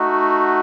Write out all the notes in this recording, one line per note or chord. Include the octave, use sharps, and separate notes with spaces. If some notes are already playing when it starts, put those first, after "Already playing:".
Already playing: A3 D#4 F#4